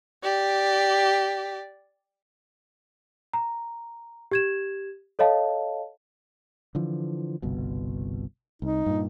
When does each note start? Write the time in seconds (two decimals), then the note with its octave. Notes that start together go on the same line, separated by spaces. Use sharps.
0.23 G4 D5
3.33 A#5
4.31 G4 G#6 E7
5.19 A4 C#5 D#5 F5 A5
6.75 D3 E3 F3
7.42 G1 C2 B2
8.62 C2 D#4
8.86 G2 A#2